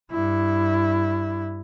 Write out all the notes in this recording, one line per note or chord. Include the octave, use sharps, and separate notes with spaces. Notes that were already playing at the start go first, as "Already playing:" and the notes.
G2 E4